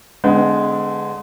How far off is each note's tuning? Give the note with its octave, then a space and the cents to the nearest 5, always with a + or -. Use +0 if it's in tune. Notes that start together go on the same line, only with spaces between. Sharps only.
D3 -15 G#3 +0 B3 +35